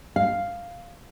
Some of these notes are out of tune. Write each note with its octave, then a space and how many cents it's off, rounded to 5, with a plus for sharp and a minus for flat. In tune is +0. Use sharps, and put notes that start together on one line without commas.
F5 +0